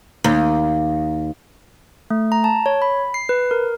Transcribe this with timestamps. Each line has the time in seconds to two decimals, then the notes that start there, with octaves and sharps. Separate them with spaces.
0.24 D#2
2.10 A3
2.32 A#5
2.44 A5
2.66 C#5
2.82 B5
3.14 C7
3.29 B4
3.51 A#4